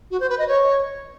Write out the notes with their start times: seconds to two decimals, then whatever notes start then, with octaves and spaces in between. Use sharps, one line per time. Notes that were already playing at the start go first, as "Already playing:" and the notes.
0.11 F#4
0.20 C5
0.29 B4
0.39 D#5
0.48 C#5